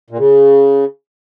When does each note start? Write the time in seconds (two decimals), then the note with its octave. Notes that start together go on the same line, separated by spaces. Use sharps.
0.10 A#2
0.18 C#3